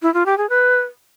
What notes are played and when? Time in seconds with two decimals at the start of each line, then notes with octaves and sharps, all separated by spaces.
0.02 E4
0.14 F4
0.26 G4
0.38 G#4
0.49 B4